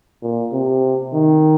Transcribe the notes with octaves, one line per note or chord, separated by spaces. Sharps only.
A#2
C3
D#3